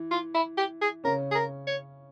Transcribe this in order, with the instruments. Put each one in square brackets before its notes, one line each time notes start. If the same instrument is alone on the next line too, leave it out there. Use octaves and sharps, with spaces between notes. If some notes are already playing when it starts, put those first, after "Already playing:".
Already playing: [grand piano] E3
[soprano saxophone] F4
E4
G4
G#4
[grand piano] C#3 C#4 [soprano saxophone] A#4
[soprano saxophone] G#4
A#4
C#5